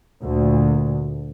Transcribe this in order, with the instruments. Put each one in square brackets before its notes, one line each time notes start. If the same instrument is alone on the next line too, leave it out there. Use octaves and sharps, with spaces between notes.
[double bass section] D2 A#2